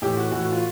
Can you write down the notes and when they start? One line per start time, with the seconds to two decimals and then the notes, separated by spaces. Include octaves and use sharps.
0.02 A2 E3 G4
0.17 F#4
0.32 A2 E3 F#4
0.42 F#4
0.52 F4